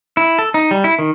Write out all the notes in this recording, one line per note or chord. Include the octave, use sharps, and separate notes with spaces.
E4
A4
D#4
G3
E4
D#3